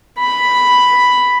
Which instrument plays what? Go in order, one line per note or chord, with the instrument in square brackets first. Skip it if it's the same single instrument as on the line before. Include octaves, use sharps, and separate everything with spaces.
[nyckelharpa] B5